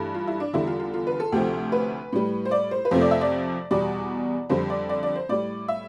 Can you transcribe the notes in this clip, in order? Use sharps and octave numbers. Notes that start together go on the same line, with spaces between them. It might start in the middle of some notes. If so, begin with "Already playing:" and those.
Already playing: G2 E3 A3
F4
E4
D4
E2 D3 G3 E4
F4
F4
F4
B4
A4
D2 C3 F3 A3 G4
B4
A2 G3
C5
D5
C5
B4
F2 C3 F3 A3 C5
D5
E5
D5
E2 B2 G3 D5
F2 D3 G3 C5
D5
D5
D5
C5
A2 G3 D5
E5